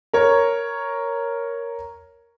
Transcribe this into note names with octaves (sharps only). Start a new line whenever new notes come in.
A#4 C#5